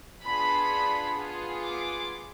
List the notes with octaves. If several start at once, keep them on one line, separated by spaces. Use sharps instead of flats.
B3 D4 F4 G#4 B5
B3 F4 G#4
D6